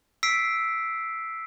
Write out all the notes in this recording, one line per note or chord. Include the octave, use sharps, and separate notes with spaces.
E6 B6 C7 D7